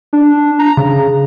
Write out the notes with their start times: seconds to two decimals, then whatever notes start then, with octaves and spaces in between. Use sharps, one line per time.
0.13 D4
0.59 A#5
0.77 C#3